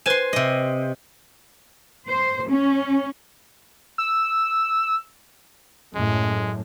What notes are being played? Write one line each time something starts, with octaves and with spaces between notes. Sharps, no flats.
B4 C5 G#5 C6 E7
C3 D#5
C5
C#4
E6
F#2 A2 G#3